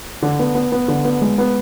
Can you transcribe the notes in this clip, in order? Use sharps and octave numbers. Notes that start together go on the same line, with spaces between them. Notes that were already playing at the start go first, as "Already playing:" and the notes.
D3
B3
B3
B3
D3
B3
G#3
B3